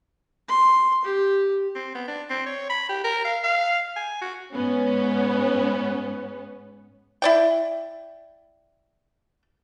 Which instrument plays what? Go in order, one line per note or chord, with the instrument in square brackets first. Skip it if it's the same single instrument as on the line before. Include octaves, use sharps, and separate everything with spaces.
[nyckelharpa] C6
G4
[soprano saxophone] C4
B3
D4
C4
C#5
B5
G4
A#4
F5
F5
G#5
F#4
[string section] G#2 B3 C#4
[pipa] E4 D5 G5